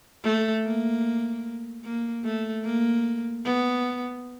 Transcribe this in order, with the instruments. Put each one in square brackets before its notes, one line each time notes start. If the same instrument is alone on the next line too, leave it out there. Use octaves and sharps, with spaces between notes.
[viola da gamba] A3
A#3
A#3
A3
A#3
B3